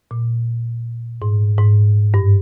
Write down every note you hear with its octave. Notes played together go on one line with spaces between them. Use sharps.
A#2
G#2
G#2
G2